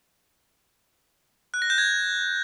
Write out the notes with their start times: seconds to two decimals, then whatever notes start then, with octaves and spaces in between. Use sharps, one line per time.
1.54 F#6
1.62 A#6
1.70 G6
1.78 G#6